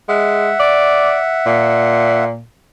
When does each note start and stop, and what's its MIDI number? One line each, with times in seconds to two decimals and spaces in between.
0.09 0.52 56
0.09 2.25 76
0.09 2.25 78
0.60 1.17 74
1.46 2.43 46